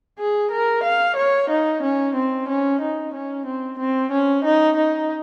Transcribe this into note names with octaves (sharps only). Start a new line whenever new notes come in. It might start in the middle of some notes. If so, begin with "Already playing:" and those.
G#4
A#4
F5
C#5
D#4
C#4
C4
C#4
D#4
C#4
C4
C4
C#4
D#4
D#4